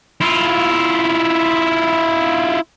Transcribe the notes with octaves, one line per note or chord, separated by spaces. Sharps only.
E4 F4